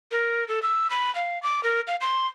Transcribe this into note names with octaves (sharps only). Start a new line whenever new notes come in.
A#4
A4
E6
B5
F5
D6
A#4
F5
C6